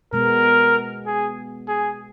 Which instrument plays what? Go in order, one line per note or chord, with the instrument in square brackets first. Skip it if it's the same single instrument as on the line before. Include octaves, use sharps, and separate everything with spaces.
[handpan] B2 G#3 B3 [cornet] A#4
[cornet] G#4
G#4